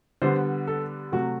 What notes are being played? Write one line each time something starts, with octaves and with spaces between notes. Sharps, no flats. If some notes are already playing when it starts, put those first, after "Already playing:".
D3 G3 B3 C5
A4
C3 F#3 A3 F#4